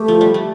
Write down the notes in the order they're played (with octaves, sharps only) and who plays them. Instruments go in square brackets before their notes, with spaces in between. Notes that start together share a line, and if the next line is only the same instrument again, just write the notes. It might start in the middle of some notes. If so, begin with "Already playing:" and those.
Already playing: [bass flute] A3 [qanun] G4
[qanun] F3
G3
A3